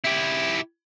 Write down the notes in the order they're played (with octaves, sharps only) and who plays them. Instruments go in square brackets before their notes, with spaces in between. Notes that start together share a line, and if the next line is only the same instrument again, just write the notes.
[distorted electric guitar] E4 G4